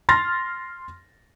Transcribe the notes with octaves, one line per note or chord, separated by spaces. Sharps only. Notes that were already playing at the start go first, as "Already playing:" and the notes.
C6 F6 A6 A#6